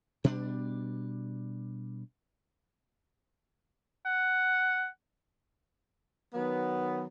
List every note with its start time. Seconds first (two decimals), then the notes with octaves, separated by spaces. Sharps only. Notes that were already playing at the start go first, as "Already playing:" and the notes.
0.24 B2 G3 C#4 D4
4.05 F#5
6.34 D#3 F#3 B3